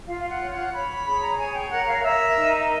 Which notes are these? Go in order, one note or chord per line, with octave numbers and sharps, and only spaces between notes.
F4 F5
F5
F#5
C#5
F#5
C#5 B5
B5
G#4 B5
A#5
C#5 G#5
G5
A#4 F#5
F5
A#4 E5
D#4